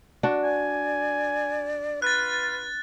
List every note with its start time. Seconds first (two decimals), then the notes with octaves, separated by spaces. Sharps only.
0.23 D4 F#4
0.44 D5 G#5
2.02 F4 B4 F#6 A6